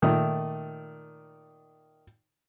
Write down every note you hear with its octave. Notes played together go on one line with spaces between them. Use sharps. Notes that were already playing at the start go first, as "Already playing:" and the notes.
A#2 D#3 A3